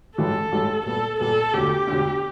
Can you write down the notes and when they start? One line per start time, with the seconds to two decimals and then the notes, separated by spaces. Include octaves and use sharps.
0.18 A1 G2 E3 G#3 A4
0.52 A1 G2 E3 G#3
0.86 A#2 G3 B3 A4
1.20 A#2 G3 B3 A4
1.53 E1 D2 D3 G4
1.87 E1 D2 D3